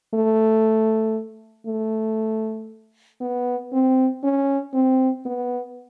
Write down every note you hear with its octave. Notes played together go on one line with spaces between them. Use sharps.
A3
A3
B3
C4
C#4
C4
B3